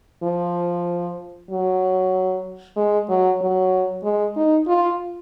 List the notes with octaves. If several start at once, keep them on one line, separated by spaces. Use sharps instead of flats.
F3
F#3
G#3
F#3
F#3
G#3
D#4
F4